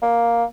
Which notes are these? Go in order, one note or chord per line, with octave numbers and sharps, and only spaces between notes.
A#3